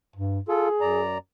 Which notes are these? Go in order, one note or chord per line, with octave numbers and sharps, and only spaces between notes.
G2
F4 G#4 A4
F#2 D5 A#5